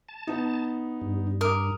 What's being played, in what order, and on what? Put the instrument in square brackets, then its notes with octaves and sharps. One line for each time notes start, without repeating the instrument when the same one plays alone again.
[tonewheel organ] A5
[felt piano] B3 D#4
[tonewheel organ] G2
[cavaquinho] A#4 [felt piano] D6 D#6